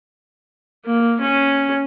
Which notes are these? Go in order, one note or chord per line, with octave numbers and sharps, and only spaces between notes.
A#3
C#4